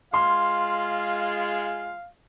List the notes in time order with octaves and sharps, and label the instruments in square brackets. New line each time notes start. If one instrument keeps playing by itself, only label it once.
[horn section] G#3 F4 [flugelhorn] F5 [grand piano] C6